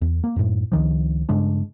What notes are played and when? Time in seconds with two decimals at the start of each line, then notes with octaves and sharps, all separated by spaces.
0.02 E2
0.24 A#3
0.36 F#2 A2
0.72 C#2 D#3 F3
1.29 G2 C#3 G#3 D4